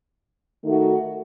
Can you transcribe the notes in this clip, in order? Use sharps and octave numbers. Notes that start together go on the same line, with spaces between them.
D#3 A3 D#4 F#4